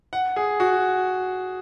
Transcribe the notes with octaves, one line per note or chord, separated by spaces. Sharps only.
F#5
G#4
F#4